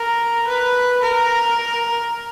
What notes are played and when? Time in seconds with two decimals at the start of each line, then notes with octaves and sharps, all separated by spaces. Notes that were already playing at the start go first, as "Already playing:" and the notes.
Already playing: A#4
0.48 B4
1.03 A#4